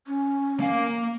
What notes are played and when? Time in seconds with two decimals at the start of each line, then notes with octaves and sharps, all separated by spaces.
0.07 C#4
0.60 A#3 F5